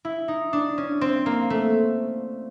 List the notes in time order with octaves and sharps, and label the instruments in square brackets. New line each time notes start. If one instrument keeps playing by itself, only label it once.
[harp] E4
D#4
D4
C#4
C4
A#3
A3